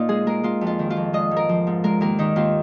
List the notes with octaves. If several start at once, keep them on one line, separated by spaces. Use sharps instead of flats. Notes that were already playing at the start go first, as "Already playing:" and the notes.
Already playing: A#2 D#4 F4
G#3 G#4
G#3 A#4
G#3 F4
F2
F4
D#3
F4
F2
G#3 D#5
G#2
A#4
F3
G#2
G#3 A#4
D#2 A#4
D#3 D#4
D#2 F4